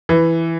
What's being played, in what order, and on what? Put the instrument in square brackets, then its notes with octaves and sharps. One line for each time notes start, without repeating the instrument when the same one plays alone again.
[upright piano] E3